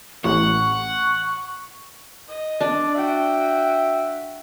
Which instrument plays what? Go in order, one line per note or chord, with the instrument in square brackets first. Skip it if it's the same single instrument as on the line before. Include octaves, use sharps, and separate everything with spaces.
[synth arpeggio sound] A1 [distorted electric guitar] F#5 [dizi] C#6
[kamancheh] D#5
[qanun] D4 [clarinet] D5
[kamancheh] F#4 G5 [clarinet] E5